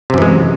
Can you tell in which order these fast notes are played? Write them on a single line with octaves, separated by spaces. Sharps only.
C3 F#2 E3 G#3